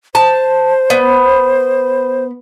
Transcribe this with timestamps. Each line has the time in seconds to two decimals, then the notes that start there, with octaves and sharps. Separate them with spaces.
0.15 C5 A5
0.90 B3